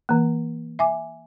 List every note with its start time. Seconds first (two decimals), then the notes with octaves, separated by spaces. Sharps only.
0.09 E3 A#3
0.79 E5 G#5 D6